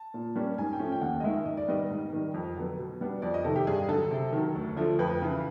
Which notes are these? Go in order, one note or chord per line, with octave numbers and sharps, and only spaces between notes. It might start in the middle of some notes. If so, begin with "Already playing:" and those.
Already playing: A5
A#2
G3 A#3 C#4
G#2 G#5
G5
F3 A3 C#4
G5
D#2 F#5
D#5
D#3 G#3 E5
G#2 D#5
D5
D#3 G3 B3 D#5
G#2
D#3 G3
F2
D3 F#3 B3
B2
G3 B3 D4
F2 D5
D#5
C3 D#3 A4
G4
G2 G#4
D3 F#3 A4
C3
D#3 F#3
D2
D3 F3 A3
F2 B4
C#3 E3